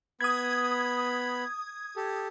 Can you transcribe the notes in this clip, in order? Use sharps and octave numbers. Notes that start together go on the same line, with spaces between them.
B3 B5 D#6 G#6
G4 A4